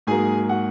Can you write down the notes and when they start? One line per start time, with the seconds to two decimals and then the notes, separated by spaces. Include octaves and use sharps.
0.07 G#2 F#3 A#3 G#4 G#5
0.49 F#4 F#5